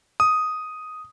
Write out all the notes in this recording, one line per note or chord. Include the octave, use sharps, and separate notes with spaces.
D#6